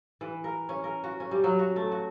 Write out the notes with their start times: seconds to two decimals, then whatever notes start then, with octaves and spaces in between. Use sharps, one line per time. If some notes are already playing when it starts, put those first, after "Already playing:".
0.21 E3
0.44 A#4
0.69 C#4
0.84 A#4
1.04 F#4
1.20 C#4
1.31 G3
1.44 F#3
1.59 F#4
1.76 A3
1.92 F#4